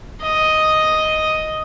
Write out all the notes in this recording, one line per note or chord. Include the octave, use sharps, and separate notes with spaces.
D#5